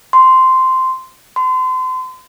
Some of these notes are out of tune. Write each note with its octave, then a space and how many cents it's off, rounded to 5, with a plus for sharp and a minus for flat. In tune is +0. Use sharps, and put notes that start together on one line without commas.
C6 -10
C6 -35